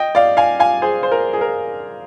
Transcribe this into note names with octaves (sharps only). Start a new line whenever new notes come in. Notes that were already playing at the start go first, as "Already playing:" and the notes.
Already playing: D#5 G5
D5 F5
F5 G#5
F5 G#5
G#4 C5
C5
A#4
G#4
A#4